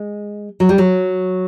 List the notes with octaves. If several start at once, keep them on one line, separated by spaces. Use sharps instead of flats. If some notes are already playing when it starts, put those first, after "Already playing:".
Already playing: G#3
F#3
G3
F#3